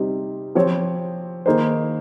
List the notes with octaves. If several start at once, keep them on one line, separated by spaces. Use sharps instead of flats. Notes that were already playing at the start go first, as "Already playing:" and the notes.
Already playing: C3 G3 C4 D#4
F3 C4 G4 C#5
D#3 A#3 D#4 G#4 C5